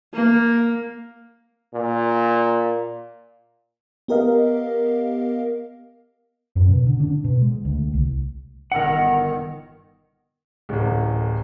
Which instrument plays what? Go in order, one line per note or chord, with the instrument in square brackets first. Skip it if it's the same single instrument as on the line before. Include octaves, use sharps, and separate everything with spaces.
[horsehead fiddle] A#3
[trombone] A#2
[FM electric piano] B3 G4 A#4 D#5 F5
[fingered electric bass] F#2
B2
D3
D4
B2
G#3
D2
C2
[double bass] G1 D#3 [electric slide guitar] A#4 F#5
[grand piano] D1 A1